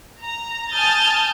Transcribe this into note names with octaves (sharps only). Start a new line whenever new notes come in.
A#5
G#5 A5 D#6 F6 G6 A6